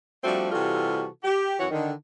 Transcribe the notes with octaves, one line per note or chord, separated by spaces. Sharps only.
F3 G3 A3 C4 D4 F#4
C3 E3 G3 F4 F#4 A4
G4
F#2 E3 F#4 C#5 F#5
D3 D#3